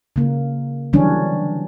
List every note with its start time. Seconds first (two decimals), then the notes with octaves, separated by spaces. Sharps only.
0.16 C#3 A#3
0.93 D3 E3 F#3 G3 C#4 D4